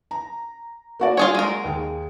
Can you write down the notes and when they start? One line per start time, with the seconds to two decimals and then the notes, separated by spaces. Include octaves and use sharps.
0.11 A#5
1.00 A#3 F#4 D5
1.17 F4 G#4 C#5
1.35 G#3 A#4
1.64 D#2 G#4